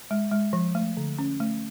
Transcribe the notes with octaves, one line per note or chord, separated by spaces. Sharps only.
G#3
G#3
F3
A3
D3
C#4
A3